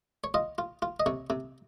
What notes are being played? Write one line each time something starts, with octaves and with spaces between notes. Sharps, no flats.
C#5
F4 D#5
F4
F4
D#5
C3 C#5
C3